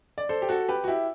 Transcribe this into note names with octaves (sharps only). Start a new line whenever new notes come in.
D5
A4 C5
G4
F#4 A4
G4 B4
F#4
E4 G4